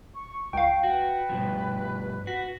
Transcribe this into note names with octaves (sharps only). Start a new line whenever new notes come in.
C#6
C#2 F5 G5
F#4 B4
G2 B2 F3
F#4 B6